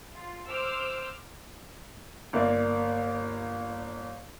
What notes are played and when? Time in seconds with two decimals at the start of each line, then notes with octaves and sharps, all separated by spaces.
0.14 F4
0.48 C5 D6 E6 F6 G6
2.33 G1 A#3 D5